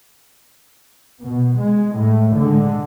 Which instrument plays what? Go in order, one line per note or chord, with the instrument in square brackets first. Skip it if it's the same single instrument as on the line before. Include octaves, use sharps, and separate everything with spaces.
[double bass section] B2
G#3
A2
D3 G#3